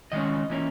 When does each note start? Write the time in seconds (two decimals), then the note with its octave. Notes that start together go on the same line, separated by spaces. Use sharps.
0.12 D#3 G#3 C#4 D#5
0.50 E3 A#3 C#4